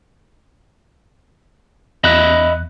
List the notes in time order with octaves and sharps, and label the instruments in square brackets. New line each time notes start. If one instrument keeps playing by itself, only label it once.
[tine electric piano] E2 F#6 [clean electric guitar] D#5 E5 B5